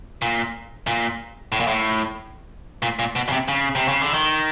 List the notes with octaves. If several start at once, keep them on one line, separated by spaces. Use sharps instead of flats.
A#2
A#2
A2
A#2
A2
A#2
A#2
B2
C#3
C3
C#3
C3
C#3
D3
D#3